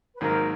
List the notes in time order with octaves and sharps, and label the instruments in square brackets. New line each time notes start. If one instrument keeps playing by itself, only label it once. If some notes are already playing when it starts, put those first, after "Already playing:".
[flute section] B4
[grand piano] G#1 G#2 D#3 F#3 A#3 [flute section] A#4